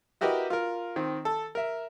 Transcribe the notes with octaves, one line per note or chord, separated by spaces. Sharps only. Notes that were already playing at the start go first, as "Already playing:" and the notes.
E4 F#4 G4 A#4 B4 D#5
F4 A#4
D#3 C4
A4
A#4 E5